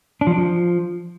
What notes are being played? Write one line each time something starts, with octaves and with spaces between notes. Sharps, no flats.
D4
F3
D4
F3